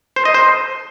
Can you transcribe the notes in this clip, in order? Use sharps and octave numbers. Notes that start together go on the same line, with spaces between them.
C5
D#5
C5